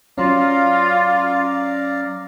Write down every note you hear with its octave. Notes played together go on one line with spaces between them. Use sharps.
F#3 C#4 F4 D5 F5 A#5